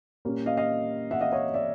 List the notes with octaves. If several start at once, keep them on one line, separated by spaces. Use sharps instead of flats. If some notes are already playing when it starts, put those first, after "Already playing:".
A#2 G3 A#3 C#4
D#5 F5
D#5 F5
E5 F#5
D#5 F5
C#5 D#5
D5 E5